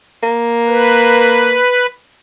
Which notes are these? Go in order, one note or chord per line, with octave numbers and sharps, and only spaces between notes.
A#3
B4